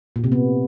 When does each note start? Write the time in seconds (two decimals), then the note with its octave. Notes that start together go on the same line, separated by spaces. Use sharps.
0.16 A#2
0.24 C3
0.32 B3